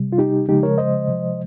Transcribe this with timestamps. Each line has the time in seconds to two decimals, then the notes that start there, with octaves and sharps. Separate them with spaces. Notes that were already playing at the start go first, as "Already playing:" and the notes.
Already playing: C3 G3
0.12 F4
0.18 D#4 G4
0.49 C#3 F3 G#3 D#4 G4
0.63 A#4 C#5
0.78 C5 D#5
1.07 C3 F3 G#3